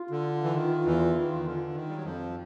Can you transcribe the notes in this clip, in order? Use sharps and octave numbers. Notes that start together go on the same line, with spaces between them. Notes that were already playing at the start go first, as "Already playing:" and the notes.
Already playing: F4
D3
E3
D#3
E2 E3
D#3
D3
D#3
G3
F#3
F2 F3